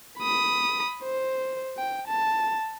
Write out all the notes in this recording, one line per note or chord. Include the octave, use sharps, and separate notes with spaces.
B5 D#6
C5
G5
A5